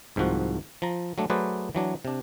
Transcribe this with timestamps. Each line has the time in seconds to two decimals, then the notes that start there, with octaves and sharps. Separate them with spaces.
0.16 C2 G#2 D#3 F3 F#4
0.82 F3 A#5
1.18 F#3 A3 D4
1.30 F#3 A3 G#4 B4 C5 D5
1.75 E3 F#3 D4
2.05 C3 D4